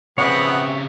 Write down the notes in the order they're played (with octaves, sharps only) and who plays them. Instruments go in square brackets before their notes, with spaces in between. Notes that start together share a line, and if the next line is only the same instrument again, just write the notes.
[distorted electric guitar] C#3 C4 [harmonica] F3 G#4 F#5 [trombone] B3 [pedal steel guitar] C#5 E5